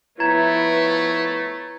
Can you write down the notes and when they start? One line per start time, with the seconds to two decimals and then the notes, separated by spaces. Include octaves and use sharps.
0.20 F3 A3 B3 E4 B4 C#5 A#5 G#6